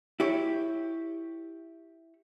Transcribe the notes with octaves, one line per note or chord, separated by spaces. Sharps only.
E4 G4 C#5